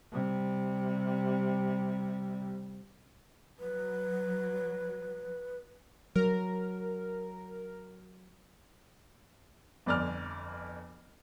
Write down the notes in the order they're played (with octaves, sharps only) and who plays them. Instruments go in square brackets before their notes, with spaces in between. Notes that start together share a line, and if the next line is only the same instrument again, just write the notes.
[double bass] C3 G3
[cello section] F#3 [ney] B4
[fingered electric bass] F#3 [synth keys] A#4
[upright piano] G1 F2 D5 G#5 F6